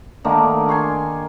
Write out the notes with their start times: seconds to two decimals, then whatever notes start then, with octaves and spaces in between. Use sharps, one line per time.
0.24 D3 D#3 A3 A#3
0.69 G#5 C6 C#6